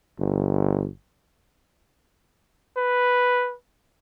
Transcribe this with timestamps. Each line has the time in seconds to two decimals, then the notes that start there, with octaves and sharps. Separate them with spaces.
0.19 G1
2.77 B4